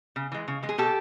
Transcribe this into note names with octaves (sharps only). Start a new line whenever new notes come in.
C#3
E3 G#3
C#3
E3 G#3
G#4
B2 G4 A4